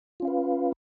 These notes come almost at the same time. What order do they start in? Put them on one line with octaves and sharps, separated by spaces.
F4 C#4 F5 B4